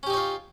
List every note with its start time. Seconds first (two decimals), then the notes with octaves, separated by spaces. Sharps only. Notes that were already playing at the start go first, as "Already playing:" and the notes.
0.03 C#4
0.07 G4
0.10 D#4
0.13 C#5
0.17 F4